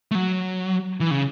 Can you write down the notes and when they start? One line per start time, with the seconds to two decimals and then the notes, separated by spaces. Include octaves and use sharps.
0.11 A3
0.15 F#3
1.00 E3
1.11 C#3